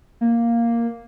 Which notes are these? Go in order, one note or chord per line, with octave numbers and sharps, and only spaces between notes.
A#3